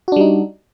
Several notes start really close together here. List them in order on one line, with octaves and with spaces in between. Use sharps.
F#4 D4 G3 D#4